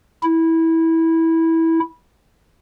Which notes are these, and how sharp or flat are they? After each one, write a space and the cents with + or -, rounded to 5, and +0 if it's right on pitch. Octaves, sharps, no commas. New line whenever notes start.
E4 -15